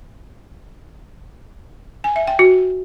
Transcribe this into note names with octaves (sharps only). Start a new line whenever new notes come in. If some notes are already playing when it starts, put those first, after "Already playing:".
G#5
E5
G5
F#4